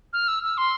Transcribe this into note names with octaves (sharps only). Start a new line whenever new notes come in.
F6
E6
E6
C6